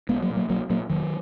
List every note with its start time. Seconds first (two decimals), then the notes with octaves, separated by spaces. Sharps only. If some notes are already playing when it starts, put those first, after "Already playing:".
0.09 B1 G#3 B3
0.22 F#3 A#3
0.30 A#2
0.37 F#3 A#3
0.49 B1 F#3 A#3
0.70 A#2 F#3 A#3
0.90 F1 D#3 F#3